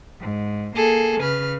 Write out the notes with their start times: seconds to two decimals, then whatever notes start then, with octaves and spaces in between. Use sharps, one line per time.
0.21 G#2
0.74 A#3 G#4 A4
1.21 C#3 B4 F6